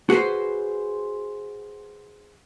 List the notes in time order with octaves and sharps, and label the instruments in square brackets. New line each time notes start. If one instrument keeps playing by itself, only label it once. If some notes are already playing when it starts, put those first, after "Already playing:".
[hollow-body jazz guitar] F#4 G#4 B4 C5